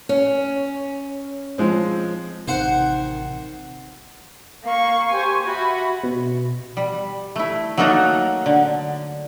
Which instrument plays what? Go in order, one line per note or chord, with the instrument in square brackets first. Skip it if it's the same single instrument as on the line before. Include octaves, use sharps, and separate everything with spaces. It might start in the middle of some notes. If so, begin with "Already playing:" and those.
[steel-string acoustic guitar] C#4
[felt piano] F3 G#3 C4
[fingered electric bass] A1 C3 [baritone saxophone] D#3 [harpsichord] C5 F#5
[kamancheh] A#3 C#6 [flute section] F5
[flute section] G4 C#6 [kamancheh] C5 G#5
[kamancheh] F#4 [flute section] E5 B5
[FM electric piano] B2
[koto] G3
A3 E4
F#3 A3 A#3 D#4 F#4 A4
D3